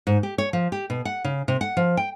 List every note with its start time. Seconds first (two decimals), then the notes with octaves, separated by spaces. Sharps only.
0.07 G#2
0.23 G4
0.38 C#5
0.53 F3
0.72 G4
0.90 B2
1.05 F#5
1.24 C#3
1.48 C3
1.61 F#5
1.77 F3
1.97 G5